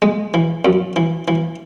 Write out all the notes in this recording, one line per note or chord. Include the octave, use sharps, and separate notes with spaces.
G#3
E3
F#2
E3
E3